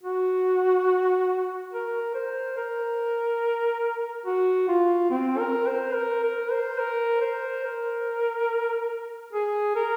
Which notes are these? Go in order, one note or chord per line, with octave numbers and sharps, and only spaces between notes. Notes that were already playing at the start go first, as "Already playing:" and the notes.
F#4
A#4
C5
A#4
F#4
F4
C4
A#4
C5
A#4
A#4
C5
A#4
C5
A#4
G#4
A#4